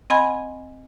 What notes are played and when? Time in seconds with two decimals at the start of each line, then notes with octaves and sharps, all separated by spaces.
0.10 C4 D#5 F#5 G#5 B5 G#6